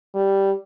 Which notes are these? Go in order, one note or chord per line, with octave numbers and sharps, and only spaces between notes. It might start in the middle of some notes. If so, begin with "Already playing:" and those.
G3